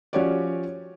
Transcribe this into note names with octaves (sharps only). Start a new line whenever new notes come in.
F3 C#4 F#4 G4 C#5 D5